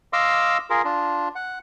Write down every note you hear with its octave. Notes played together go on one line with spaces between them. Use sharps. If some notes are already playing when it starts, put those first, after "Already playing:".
D#5 F5 C6 D6 E6
F4 G#4 A#4
D4 F4
F#5